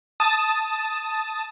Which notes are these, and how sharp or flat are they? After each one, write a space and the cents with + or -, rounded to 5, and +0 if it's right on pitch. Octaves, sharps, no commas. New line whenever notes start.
A5 +0 D#6 +10